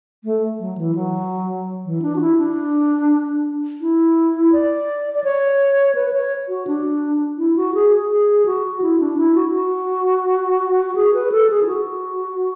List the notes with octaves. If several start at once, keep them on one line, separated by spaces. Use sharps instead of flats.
A3
F#3
E3
F#3
E3
D4
F#4
E4
D4
E4
D5
D5
C#5
B4
C#5
F#4
D4
E4
F#4
G#4
G#4
F#4
E4
D4
E4
F#4
F#4
G#4
B4
A4
G#4
E4
F#4